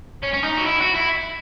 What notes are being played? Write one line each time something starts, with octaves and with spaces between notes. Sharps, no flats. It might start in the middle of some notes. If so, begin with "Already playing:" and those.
C#4
C#4
D#4
F#4
E4
F#4
E4